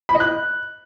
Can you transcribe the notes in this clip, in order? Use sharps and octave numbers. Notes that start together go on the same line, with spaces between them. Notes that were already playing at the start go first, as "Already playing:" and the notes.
B5
D#5
F#6